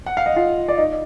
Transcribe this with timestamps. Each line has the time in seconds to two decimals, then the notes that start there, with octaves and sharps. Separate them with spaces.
0.06 F#5
0.17 F5
0.26 D#5
0.36 F4 F5
0.68 D5
0.77 D#4 D#5